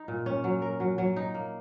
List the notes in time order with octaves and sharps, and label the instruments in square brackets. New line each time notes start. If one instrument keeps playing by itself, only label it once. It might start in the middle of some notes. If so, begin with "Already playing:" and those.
Already playing: [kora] D#4
A#2
C#4
F#3
A#4
F#3
F#3
D#4
A#3